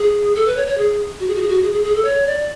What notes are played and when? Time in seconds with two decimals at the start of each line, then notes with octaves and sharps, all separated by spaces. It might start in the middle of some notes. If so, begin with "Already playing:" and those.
Already playing: G#4
0.35 A4
0.46 B4
0.57 C#5
0.67 C#5
0.78 G#4
1.20 F#4
1.28 G#4
1.35 F#4
1.42 G#4
1.49 F#4
1.63 G#4
1.73 G#4
1.84 G#4
1.95 A4
2.05 C#5
2.27 D5